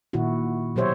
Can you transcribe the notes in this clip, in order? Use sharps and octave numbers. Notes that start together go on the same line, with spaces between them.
A#2 D#3 E4 F#4
B2 F#3 G4 C5 C#5 E5